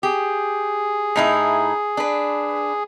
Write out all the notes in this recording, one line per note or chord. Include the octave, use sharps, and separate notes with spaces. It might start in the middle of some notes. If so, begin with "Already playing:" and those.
G4 G#4
A2 D#4 E4
D4 B4